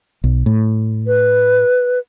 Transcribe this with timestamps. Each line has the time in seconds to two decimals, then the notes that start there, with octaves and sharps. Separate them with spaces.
0.24 B1
0.46 A2
1.07 B4